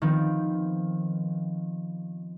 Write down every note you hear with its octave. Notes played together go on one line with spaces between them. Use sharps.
D#3 F3 B3 C4